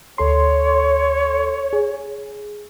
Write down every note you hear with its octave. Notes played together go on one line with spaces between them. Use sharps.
D2 A4 C#5 C6
G#4